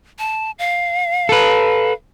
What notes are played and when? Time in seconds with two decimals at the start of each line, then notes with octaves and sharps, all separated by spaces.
0.19 A5
0.59 F5
1.29 A4 B4